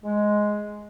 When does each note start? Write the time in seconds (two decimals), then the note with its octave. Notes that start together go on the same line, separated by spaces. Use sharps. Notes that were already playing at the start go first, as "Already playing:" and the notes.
0.04 G#3